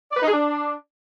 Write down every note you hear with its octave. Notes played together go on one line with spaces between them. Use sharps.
D5
B4
D#4
G#4
D4